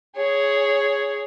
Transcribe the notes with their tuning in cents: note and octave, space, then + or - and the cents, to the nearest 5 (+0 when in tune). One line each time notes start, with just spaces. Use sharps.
G#4 +0 C#5 +5